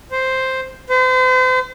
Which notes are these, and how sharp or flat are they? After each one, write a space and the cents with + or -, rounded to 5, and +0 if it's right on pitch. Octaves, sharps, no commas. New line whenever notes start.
C5 +0
C5 -40